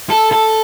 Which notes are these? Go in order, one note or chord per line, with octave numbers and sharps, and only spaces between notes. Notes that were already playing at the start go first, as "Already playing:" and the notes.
A4
A4